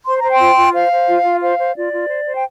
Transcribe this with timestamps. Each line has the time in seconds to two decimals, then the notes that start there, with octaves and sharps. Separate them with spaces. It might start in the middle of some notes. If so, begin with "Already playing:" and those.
0.06 C5 C6
0.19 C5 A#5
0.30 G5 C6
0.40 F4
0.56 F4
0.73 C5 F5
0.91 C5
1.07 F4
1.25 F4
1.41 C5 F5
1.58 C5
1.76 F4 D5
1.92 F4
2.09 C5
2.26 C5
2.34 G5